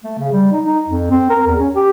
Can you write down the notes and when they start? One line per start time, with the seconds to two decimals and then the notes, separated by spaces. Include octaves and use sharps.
0.04 A3
0.18 C#3
0.33 G3
0.51 D#4
0.65 D#4
0.88 F2
1.11 C4
1.30 A#4
1.47 E2
1.59 C#4
1.75 G4